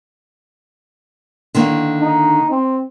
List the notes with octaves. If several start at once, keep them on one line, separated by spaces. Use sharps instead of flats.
D3 D#3 A#3
D#4
C4